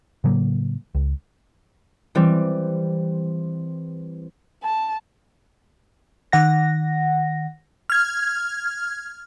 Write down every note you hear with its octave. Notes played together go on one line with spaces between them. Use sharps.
A2 C#3 F#3 A#3
C#2
E3 G3 C4
A5
D#3 F#5 A#6
F6 G#6